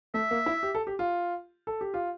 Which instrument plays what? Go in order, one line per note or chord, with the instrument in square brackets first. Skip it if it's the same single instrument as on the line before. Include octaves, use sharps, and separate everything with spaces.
[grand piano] A3 [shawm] E5
[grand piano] A#3
E4
G4
A4
G4
F4
A4
G4
F4